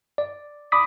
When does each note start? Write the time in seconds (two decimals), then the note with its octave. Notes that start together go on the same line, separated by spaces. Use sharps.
0.18 D5
0.72 B5 D6 D#6 B6